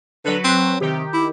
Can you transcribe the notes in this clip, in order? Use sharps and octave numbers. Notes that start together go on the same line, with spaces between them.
D3 F#3 B4
C4
C3 D#3 G4
E4